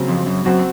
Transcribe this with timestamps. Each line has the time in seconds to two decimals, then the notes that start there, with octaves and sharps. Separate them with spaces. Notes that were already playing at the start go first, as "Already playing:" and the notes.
Already playing: C#3 F#3 C4
0.09 F2
0.26 F#2
0.45 F#2 F#3 C4 F#4